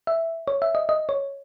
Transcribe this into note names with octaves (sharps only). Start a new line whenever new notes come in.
E5
C#5
E5
D#5
D#5
C#5